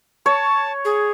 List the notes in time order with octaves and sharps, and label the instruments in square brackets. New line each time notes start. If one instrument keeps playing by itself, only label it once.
[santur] C#5 [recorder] A5
[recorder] G#4